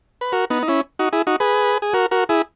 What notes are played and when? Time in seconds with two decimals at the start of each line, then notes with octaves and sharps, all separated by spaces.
0.21 B4
0.32 F#4 A#4
0.50 B3 D#4
0.63 D#4
0.68 C#4 E4
0.99 D#4 F#4
1.13 E4 G#4
1.27 D#4 F#4
1.40 G#4 B4
1.82 G#4
1.93 F#4 A#4
2.11 F#4 A#4
2.29 E4 G#4